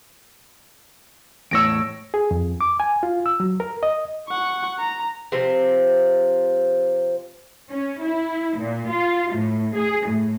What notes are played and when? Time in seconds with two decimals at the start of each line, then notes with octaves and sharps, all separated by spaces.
1.51 E2 A2 C#5 E6 A#6 D7
2.14 G#4
2.31 F2
2.61 D6
2.80 G#5
3.03 F4
3.26 E6
3.40 F#3
3.60 A#4
3.83 D#5
4.29 F#5 C#6
4.79 A#5
5.32 C3 F3 C4
7.70 C#4
8.03 E4
8.58 A#2
8.89 F4
9.34 A2
9.75 G#4
10.07 A2